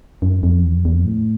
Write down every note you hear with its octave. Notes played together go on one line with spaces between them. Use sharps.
F#2
F2
E2
F2
E2
F2
A2